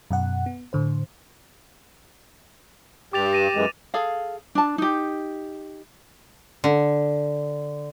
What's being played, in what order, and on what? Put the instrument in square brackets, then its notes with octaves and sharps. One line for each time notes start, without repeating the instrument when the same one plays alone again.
[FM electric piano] F#2 B2 F#5
B3
A2 D3 C5
[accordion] G2 [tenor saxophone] G4 [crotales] D6 A6 F7
[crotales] A#6 D#7 E7
[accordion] F#2 E3 G#3
[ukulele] G#4 A4 F5
D4 A5
D#4 G4
[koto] D3